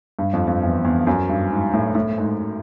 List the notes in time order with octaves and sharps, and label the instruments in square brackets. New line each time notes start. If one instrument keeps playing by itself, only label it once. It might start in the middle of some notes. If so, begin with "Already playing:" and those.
[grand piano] G2
F2
F2
E2
E2
F#2
G2
G#2
A2
A2
G#2